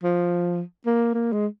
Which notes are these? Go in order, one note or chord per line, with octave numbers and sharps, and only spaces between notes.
F3
A#3
A#3
G#3